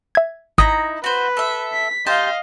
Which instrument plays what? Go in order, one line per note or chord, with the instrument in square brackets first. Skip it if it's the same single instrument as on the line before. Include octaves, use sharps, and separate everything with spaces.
[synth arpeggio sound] E5 G#6
[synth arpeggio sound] G#1 D#6 [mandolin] D#4 E4 A#5
[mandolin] F#4 C5 [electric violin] B4
[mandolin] A4 E5
[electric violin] B6
[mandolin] G4 C5 A5 [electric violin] D#5 F5